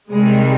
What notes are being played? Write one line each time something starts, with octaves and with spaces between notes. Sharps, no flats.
C3 D#3 G3 G#3